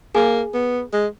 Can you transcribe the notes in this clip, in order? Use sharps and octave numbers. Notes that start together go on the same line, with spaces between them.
A#3 G#4 G#5
B3
G#3